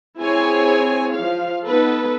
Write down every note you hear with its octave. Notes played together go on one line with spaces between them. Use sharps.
C4 E4 G#4 C#5 G#5
F3 F5
B3 D#4 A4 B4